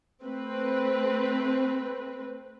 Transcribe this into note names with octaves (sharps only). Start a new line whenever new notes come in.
A3 C4 B4